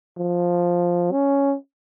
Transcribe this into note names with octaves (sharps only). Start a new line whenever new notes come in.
F3
C#4